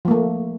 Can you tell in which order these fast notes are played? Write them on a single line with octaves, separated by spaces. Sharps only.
F3 A#3 A3